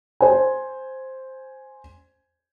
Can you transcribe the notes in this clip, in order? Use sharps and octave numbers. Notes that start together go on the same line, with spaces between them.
C5 G#5